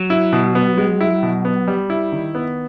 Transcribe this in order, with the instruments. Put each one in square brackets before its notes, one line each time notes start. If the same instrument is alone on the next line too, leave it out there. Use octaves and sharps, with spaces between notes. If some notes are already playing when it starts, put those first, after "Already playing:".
Already playing: [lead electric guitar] F#3
[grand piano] E4
B2
B3
G#3
E4
B2
B3
G3
E4
D#3
B3